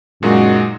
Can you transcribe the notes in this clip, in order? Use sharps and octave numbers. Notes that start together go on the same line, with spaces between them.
F#2 A#2 G#3 D#4 F#4